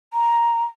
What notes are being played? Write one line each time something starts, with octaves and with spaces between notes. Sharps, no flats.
A#5